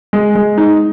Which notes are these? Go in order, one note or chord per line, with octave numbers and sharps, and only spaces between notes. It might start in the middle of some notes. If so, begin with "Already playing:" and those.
G#3
G#3
D#4